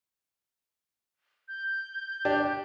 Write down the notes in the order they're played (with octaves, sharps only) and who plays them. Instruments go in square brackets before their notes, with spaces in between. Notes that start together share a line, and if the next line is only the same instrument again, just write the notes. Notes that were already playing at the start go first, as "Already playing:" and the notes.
[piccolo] G6
[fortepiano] D4 G4